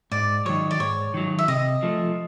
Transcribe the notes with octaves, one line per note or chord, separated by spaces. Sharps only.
G#2 D5
D#3 F#3 C#5
D5
G#2 C#5
D#3 F#3
E5
C3 D#5
F3 A3